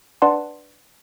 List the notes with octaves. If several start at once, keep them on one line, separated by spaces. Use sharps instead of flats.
D4 B4 D5 F#5 A5 C6